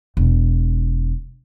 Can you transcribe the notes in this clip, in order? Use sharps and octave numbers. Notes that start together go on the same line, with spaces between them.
E1